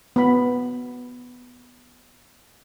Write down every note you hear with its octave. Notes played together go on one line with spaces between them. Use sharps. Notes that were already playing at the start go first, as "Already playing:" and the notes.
B3 B5